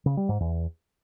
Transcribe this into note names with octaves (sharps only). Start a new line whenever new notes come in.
C#3
G3
G#2
E2